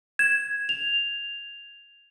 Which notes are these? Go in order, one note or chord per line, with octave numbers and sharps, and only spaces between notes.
G#6 E7
F7